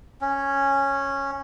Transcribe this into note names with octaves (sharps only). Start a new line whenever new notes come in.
C#4